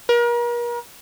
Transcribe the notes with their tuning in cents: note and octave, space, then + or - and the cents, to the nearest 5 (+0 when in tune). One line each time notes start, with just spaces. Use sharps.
A#4 +40